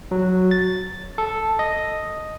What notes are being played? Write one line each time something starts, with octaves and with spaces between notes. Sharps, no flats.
F#3
A6
A4
D#5